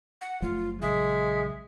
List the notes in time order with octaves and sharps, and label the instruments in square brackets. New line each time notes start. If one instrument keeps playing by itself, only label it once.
[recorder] F#5
[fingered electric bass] F#1 F3 A3 [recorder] F4
[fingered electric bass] A#1 C#3 F#3 [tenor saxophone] G#3 [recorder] E5